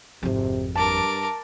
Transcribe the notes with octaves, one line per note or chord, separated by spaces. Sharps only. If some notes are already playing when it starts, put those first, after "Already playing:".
G#1 F2 C3
G2 A#4 A5 D6